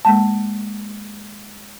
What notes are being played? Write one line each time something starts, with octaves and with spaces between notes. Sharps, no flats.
G#3 A#3 A5